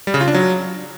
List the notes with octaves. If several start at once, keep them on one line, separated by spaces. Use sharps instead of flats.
G3
C#3
F4
D4
F#3